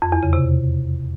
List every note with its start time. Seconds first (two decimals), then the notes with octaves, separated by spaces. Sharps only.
0.02 F2
0.12 E2
0.23 C#3
0.33 C3